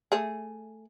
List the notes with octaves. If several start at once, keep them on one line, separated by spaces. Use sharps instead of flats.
A3 G#4